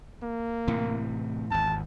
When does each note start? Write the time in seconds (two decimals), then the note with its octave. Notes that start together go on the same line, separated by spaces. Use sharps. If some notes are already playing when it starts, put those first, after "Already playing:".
0.23 A#3
0.67 A2 C3 E3
1.51 G#1 E2 A5